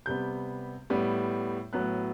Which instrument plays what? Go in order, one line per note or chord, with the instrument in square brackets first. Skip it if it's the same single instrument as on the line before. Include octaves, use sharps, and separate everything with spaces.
[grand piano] C3 G3 B3 G6
A2 G3 B3
A2 F#3 B3 F#6